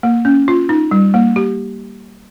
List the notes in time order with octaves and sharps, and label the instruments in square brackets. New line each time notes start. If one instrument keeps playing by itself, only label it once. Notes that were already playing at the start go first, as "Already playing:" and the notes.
[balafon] A#3
C#4
F4
D#4
G3
A#3
G4